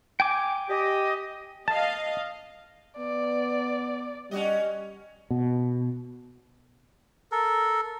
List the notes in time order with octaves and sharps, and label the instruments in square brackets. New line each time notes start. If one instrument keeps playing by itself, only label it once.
[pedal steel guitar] G5 G#5 D6
[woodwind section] G4 D#5
[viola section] D#5 F5 [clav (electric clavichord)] A5
[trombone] B3 [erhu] D5
[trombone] G3 [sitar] C#4 F#4 D#5
[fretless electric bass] B2
[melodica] A4 A#4